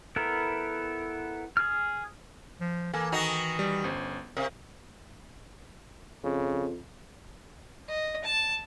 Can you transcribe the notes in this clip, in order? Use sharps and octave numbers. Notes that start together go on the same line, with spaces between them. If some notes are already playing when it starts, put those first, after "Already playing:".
B3 E4 A4 A#4
G#4 F6
F3
E3 A#3 A4 G#5
D#3 D#4 F#4
G3
G1 C#4 C5
C3 A#4 F5
F2 C#3
D#5
A5